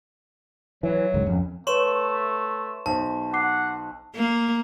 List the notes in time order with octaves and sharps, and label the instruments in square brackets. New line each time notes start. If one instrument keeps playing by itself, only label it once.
[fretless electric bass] E3 [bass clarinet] F#3
[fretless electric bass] C#2 G#2 D#3
F2 C#4
[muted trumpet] A3 [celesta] B4 C#5 [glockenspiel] C6 C#6 E7
[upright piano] B1 C5 [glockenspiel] A5
[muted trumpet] F#5 [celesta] D6 C7
[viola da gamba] A#3